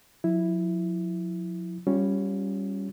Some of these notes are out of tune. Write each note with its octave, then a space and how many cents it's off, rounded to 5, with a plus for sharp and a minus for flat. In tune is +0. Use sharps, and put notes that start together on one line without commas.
F3 +45 E4 +0
G3 +0 C#4 +0 F4 +30